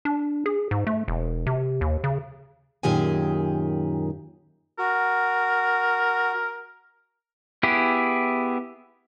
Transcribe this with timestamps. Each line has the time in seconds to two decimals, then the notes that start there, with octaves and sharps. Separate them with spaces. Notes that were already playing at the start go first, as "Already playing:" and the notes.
0.05 D4
0.46 G#4
0.71 G#2
0.87 A3
1.08 E1
1.47 C3
1.81 D#2
2.04 C#3
2.83 F#2 A#2 D#3 G4 G#4 G#5
4.79 F#4 A#4
7.63 B3 E4 G4 G#4